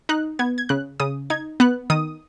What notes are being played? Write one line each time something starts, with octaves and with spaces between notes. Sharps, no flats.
D#4 F#6
B3 G#6
G#6
C#3 F#6
C#3 D#6
D#4 G#6
B3 F#6
D#3 D#6